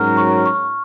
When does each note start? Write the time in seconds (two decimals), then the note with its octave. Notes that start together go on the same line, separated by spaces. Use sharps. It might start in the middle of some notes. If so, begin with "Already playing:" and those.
Already playing: G#2 F#3 C#4 F#4 A#4 F6
0.17 C#6
0.46 C#6